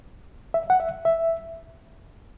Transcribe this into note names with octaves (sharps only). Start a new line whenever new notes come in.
E5
F#5
E5
E5